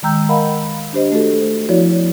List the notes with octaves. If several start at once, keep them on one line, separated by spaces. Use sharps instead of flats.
D#3 G#3 G5 A#5 E6 G6
A#4 D#5 F5 F#5 B5
D4 G4 C5 D#5
A3 F#4 A4
F3 B3 E4 F#4 C#5 D5